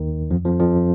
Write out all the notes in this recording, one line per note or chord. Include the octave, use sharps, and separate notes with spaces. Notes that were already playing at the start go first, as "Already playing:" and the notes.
Already playing: D#2 D#3
F2 F3
F2 F3
F2 F3